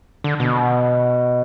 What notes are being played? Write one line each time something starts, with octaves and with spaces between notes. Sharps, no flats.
D3
B2